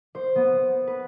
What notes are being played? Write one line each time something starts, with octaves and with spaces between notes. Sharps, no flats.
C5
B3
B4